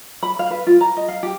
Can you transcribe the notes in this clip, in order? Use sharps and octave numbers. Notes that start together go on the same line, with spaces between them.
B5
F5
B4
F4
A#5
D#5
F5
G4